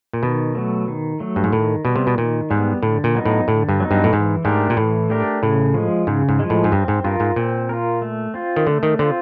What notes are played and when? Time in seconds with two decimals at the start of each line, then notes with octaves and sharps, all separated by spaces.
0.13 A#2
0.23 B2 D#3
0.55 F#3 A3
0.88 D#3
1.20 F#3 A3
1.36 G2
1.44 G#2
1.53 A2 D#3
1.85 B2 G3 B3
1.96 C3
2.07 B2
2.18 A#2 D#3
2.50 G#2 G3 B3
2.82 A2 D3
3.04 A#2
3.15 F#3 B3 D#4
3.25 A2
3.48 A2 D3
3.69 G2
3.80 F#3 B3 D#4
3.91 G2
4.04 A2
4.12 G#2 E3
4.44 G#2 A3 D4 G4 A#4
4.70 A#2
4.77 A2 E3
5.10 A3 D4 G4 A#4
5.42 A2 C#3
5.74 F3 G#3
6.07 G#2 C#3
6.29 G#2
6.39 F3 G#3
6.50 A2
6.64 G#2
6.72 G2 C4
6.88 G#2
7.04 G2 F4 A#4
7.20 G#2
7.36 A#2 C4
7.69 F4 A#4
8.02 A3
8.34 C4 F4
8.56 D#3
8.67 D3 A3
8.83 D#3
8.99 D3 C4 F4